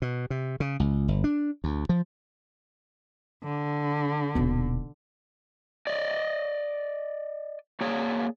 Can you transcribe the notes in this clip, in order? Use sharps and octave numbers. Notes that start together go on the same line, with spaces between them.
B2
C3
C#3
C#2
G1
D4
D2
F3
D3
D#1 B2 D#3
D5 D#5
A#3 G#4 C#5 D5